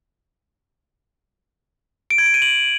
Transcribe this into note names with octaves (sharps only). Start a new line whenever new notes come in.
D7
G#6
D7
D#7
F#7